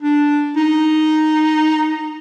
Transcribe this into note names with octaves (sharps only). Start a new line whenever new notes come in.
D4
D#4